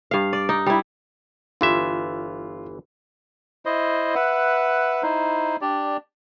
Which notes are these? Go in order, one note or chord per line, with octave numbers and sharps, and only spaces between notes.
G2 F5
D5
D#4
G3 E4
G1 E3 F4 E5
E4 C5 D#5
B4 E5 F#5
D#4 E4 C5
D4 G4 D5